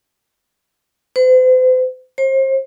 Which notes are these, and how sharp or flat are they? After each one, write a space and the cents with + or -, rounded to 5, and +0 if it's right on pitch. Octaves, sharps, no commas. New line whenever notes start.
C5 -40
C5 +35